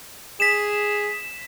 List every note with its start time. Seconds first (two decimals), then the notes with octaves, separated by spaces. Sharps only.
0.40 G#4 B6 E7